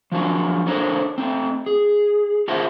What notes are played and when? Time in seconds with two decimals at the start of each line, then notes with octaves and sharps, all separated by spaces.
0.12 F3 F#3 D4 F#4 A#4
0.66 D4 A4 A#4 C5 C#5
1.18 A3 C4
1.66 G#4
2.48 F4 G#4 A#4 C5 E5 F#5